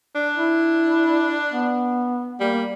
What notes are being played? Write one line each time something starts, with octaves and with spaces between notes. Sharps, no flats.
D4
E4
B3
G3 A#3